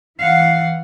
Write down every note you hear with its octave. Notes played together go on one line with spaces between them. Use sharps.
E3 F5 F#5